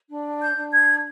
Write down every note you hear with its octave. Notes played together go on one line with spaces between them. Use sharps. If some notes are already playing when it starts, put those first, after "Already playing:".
D4
G6
D4
G#6